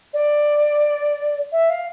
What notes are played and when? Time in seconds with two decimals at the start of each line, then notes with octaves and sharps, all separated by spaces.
0.13 D5
1.52 E5
1.69 F5